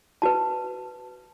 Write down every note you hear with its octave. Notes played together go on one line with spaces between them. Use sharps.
F#4 B4 A5